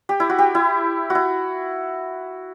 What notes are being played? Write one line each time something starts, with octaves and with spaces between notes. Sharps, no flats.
G4
E4
F#4
G4
E4
F#4
E4